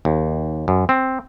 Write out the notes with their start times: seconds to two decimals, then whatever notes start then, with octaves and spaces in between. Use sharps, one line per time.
0.05 D#2
0.68 F#2
0.89 C4